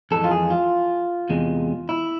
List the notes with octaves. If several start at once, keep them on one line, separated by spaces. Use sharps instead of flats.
F2 E3 G#3 A4
F4
G#4
F4
E2 C3 G#3
E4